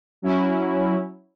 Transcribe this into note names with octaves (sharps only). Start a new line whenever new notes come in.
F#3 C#4 E4